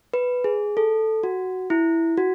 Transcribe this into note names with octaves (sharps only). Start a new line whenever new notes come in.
B4
G#4
A4
F#4
E4
F#4